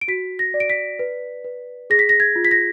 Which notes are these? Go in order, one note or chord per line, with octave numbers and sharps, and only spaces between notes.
D7
F#4 B6
A#6
D5
D7
B6
B4
B4
G#4 A#6
B6
A#6
G#6
F4
B6
A#6